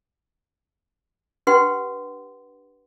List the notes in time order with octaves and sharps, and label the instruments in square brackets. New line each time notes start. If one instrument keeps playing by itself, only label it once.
[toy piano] D4 G4 B4 F#5 G5 C6